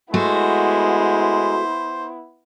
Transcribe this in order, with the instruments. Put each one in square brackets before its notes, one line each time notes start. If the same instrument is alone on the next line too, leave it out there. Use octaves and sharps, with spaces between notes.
[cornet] G#3 [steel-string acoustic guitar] A3 F#4 [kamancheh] B3 E4 [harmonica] C5